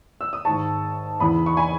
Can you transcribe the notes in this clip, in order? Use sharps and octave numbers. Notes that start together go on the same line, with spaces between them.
E6
D#6
G#2 D#3 A5 C#6
E2 C#3 E3 B5 D#6
C#6
G#5 B5